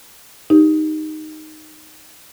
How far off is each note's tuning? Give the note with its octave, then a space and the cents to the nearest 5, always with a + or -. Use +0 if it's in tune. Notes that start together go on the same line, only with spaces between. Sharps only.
D#4 -5 G4 +5